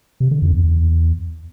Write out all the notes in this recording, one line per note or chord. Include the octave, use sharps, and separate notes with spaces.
C3
D3
F2
E2
E2